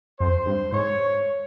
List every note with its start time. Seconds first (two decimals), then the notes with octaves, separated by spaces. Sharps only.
0.20 F2 C5
0.46 G2
0.72 G#2 C#5